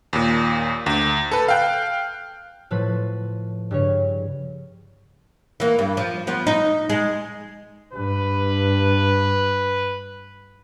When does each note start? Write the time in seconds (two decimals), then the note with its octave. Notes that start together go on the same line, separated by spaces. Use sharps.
0.13 D#2 A#2
0.86 D2
1.32 A4 B4
1.48 F5 G5 F#6
2.71 A2 F3 B4
3.71 G2 C#3 C#5
5.60 E3 A#3
5.79 G2
5.97 F3
6.27 F3 B3
6.47 D#4
6.90 G#3
7.93 G2 B4